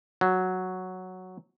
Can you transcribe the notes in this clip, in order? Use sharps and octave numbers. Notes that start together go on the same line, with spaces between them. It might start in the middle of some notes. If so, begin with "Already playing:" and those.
F#3